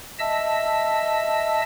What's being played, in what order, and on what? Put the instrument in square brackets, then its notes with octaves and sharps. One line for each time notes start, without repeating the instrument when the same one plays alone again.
[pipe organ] D#5 E5 A5 E6